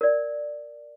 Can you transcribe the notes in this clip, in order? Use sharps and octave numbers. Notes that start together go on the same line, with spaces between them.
A#4 D5